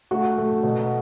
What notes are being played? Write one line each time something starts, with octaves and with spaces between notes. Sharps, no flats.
A3 F#4
A3
B2